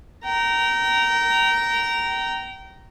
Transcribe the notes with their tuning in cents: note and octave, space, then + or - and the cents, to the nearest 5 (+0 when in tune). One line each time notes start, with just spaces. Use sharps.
G5 -30 A#5 +0